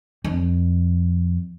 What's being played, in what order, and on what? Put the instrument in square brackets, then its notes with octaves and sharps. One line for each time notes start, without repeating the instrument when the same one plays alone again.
[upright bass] F2